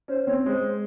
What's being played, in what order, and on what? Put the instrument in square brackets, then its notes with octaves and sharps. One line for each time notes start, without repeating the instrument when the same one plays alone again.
[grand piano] C#4 [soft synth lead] C5
[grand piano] C4 [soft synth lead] C#5
[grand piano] G#3 [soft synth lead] C5